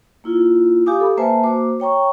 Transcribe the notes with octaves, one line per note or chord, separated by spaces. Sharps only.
A#3 E4 F4
G4 F5 G#5 D6 D#6
A4 B5
A#3 B4 C5 E5 G#5 A5
A#3 F#4 C5 D6
C#5 G5 A#5 C#6